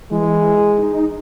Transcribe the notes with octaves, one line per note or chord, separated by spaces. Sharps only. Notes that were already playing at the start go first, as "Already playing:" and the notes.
E3 G#3
D#4